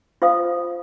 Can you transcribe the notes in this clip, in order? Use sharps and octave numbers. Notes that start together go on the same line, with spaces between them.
F4 C5 F5 D#6